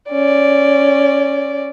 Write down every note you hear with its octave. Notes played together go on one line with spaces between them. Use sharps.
C#4 D5